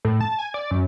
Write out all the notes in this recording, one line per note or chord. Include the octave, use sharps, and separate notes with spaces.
A2
A5
G#5
D5
F#2